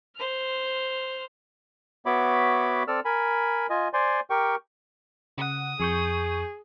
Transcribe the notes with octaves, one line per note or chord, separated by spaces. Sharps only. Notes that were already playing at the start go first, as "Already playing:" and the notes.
C5 F6
B3 F#4 C#5 E5 B5 D6
C4 A4 D5 E6 F6
A#4 G#5 B5
F4 D#5 G#5
C5 D5 G#5 C6
G4 A#4 G5 C#6
C#3 F#5 D#6
F2 G#4 C#6 G6